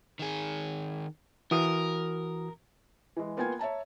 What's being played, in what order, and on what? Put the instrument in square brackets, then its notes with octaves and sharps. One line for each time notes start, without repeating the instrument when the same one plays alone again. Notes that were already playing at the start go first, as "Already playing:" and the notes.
[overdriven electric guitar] D#3 G#4
[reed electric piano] E3 F#4 D#6 [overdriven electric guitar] A#4
[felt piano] E3 G#3
A#3 B3 F4 G5 G#5 G#6
C#5 E5 A5 A#5